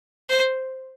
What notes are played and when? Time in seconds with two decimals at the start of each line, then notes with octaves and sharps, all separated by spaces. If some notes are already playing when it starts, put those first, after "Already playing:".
0.29 C5